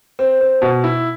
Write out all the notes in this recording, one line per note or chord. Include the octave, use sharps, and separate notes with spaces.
C4
C4
B2
E4